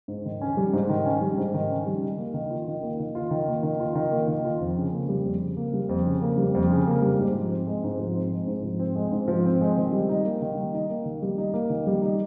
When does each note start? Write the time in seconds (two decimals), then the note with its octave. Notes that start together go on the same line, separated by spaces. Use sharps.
0.08 G#2
0.25 D#3
0.41 C#4
0.57 G3
0.73 G#2
0.89 D#3
1.05 C#4
1.21 G3
1.38 G#2
1.54 D#3
1.70 C#4
1.87 G3
2.02 D#3
2.18 A#3
2.34 D#3
2.50 F4
2.67 D#3
2.83 A#3
3.00 D#3
3.15 F4
3.31 D#3
3.48 A#3
3.63 D#3
3.80 F4
3.95 D#3
4.11 A#3
4.28 D#3
4.44 F4
4.60 F2
4.77 C#3
4.92 A#3
5.09 G3
5.25 F2
5.41 C#3
5.57 A#3
5.73 G3
5.89 F2
6.06 C#3
6.22 A#3
6.38 G3
6.55 F2
6.71 C#3
6.87 A#3
7.02 G3
7.18 G#2
7.35 F3
7.50 C4
7.67 G#3
7.84 G#2
7.99 F3
8.15 C4
8.32 G#3
8.47 G#2
8.64 F3
8.79 C4
8.96 G#3
9.12 G#2
9.28 F3
9.45 C4
9.61 G#3
9.77 D#3
9.92 G3
10.09 D#4
10.25 A#3
10.42 D#3
10.58 G3
10.74 D#4
10.90 A#3
11.05 D#3
11.22 G3
11.38 D#4
11.54 A#3
11.70 D#3
11.87 G3
12.02 D#4